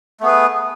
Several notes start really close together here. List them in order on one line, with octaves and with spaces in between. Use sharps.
A3 B3 G#4 B4